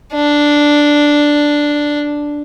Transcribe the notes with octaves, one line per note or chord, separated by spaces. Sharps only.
D4